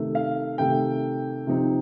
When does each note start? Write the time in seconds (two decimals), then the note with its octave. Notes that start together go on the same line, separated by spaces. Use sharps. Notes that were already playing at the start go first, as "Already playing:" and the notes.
Already playing: C3 D#3 A3
0.15 F5
0.58 C3 D#3 A3 G5
1.47 C3 F3 C4 D#4